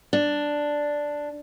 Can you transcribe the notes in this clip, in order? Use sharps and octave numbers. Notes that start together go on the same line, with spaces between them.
D4